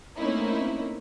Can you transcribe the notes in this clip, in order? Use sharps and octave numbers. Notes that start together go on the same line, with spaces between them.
A3 A#3 C4 C#4 D#4 E4